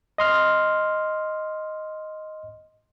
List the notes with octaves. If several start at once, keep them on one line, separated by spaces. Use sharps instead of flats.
D#5 C6 F6